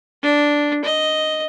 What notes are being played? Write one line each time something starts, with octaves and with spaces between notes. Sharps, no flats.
D4
D#5